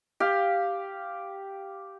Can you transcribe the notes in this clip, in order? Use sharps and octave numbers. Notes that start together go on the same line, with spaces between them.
G4 F5